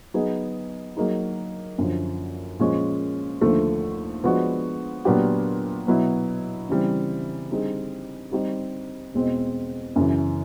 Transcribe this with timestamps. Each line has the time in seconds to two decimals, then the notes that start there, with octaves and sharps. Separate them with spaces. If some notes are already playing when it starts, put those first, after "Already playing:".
0.14 F#3 B3 D#4 G#4
0.96 F#3 A#3 D#4 G#4
1.78 F#2 D3 F3
2.59 A#2 F3 G#3 C#4
3.41 D#2 D3 F3 A3
4.24 F3 G#3 B3 D4 F#4
5.05 A#2 F#3 B3 D4 G4
5.87 B2 F#3 B3 E4
6.69 C#3 E3 G3 C4
7.51 D3 G3 C4 D#4 G#4
8.32 G3 C4 D#4 G4
9.14 E2 B2 G#3 C4
9.96 F#2 C#3 E3